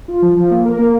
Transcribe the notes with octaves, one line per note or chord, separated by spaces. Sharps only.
F4
F3
F3
A#3
A#4
A#3